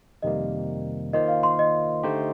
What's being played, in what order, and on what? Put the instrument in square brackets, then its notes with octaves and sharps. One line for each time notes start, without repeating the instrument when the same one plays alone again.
[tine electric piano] F2 C3 D#3 G3 A#3 [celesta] D#5
[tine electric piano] D#3 A#3 F4 C5 [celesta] D#5
[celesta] F5
C6
D#5
[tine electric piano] D3 A3 D#4 G4 C5